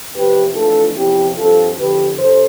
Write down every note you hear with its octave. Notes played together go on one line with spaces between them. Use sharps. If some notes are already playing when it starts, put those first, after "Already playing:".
E2 C3 F3 C4 G4 B4
F2 E3 A3 D4 F4 A4
E2 C3 F3 C4 E4 G4
G2 F3 C4 F4 A4
E2 D3 F3 G4 B4
G2 A4 C5